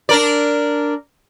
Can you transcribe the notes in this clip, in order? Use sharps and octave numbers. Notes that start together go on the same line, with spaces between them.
D4 A#4 D5